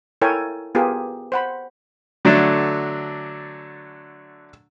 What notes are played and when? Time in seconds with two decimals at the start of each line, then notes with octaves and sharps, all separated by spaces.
0.22 E4 A4 A#4 C#5 G5 G#5
0.75 B3 F4 G4 G#4 A#4
1.32 C5 F#5 B5
2.25 D3 F#3 A3 D4